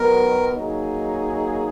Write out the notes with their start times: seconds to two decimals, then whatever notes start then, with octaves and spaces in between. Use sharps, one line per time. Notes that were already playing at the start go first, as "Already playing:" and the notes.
Already playing: D#3 F#3 B3 A#4
0.52 F#3 A#3 D#4 G#4